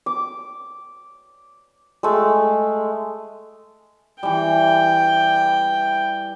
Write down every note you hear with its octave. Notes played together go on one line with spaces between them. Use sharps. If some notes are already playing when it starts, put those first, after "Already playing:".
D6
G#3 A3
E3 G3 G5